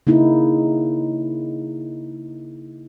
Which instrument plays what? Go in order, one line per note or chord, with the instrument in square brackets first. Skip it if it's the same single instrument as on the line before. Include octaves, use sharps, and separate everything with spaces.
[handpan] C#3 A#3 D#4 E4